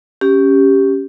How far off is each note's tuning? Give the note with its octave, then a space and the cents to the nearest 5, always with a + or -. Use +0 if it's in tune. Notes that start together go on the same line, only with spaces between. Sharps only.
C#4 +0 G4 +0